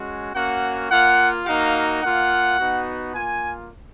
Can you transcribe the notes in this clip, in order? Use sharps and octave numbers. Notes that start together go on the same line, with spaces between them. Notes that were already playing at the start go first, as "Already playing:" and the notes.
Already playing: G#3 C#4 F#4
A#3 C#4 F#4 F#5
A#3 F4 F#5
A#3 D#4 F#4 F5
A#3 F4 F#5
B3 D#4 F#4
A#3 F4 G#5